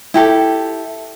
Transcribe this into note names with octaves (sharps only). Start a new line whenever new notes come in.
E4 G4 A4